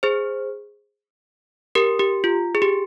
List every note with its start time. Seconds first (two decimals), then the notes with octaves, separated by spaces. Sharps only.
0.03 G#4 C5
1.75 G4 A#4
1.99 G4
2.24 F4
2.55 G#4
2.62 G4